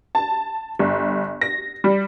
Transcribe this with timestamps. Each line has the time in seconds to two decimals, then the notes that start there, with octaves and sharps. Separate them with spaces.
0.15 A5
0.79 G1
1.41 A#6
1.84 G3